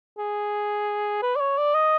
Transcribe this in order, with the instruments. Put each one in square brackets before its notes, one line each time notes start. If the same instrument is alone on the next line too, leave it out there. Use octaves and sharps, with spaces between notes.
[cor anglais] G#4
B4
D5
C#5
D5
D#5